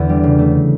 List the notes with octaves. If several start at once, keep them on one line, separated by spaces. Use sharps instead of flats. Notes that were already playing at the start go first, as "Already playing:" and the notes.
Already playing: E2 D3
G3
C#3
A3